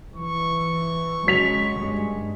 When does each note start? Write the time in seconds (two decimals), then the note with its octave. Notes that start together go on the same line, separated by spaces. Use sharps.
0.16 E3 C#6
1.27 C#3 F#3 G#3 B6 F7
1.78 G2 G#3